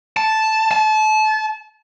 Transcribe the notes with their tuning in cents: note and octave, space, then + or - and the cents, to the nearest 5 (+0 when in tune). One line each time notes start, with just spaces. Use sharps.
A5 -5
A5 -30